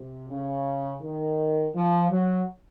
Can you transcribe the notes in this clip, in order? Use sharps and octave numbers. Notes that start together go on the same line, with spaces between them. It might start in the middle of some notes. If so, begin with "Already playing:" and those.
Already playing: C3
C#3
D#3
F3
F#3